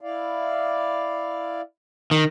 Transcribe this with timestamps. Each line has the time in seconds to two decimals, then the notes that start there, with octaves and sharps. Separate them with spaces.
0.01 E4 D5 F5
2.11 D#3